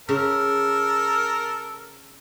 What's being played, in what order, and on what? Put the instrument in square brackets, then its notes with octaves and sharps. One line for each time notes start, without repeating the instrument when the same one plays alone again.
[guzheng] C#3 [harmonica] A4 A#4